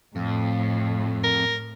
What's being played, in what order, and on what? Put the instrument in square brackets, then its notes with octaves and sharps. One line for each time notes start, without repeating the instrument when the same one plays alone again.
[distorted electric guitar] F2 [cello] A2
[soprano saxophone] A#4